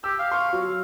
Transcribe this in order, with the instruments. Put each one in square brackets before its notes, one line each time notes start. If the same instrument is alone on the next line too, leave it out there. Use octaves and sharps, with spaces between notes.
[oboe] G4 [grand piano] E6
[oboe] F5
[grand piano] C6 C#6
F#3